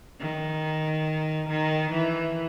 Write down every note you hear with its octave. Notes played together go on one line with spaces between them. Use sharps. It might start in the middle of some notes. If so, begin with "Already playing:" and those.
D#3
D#3
E3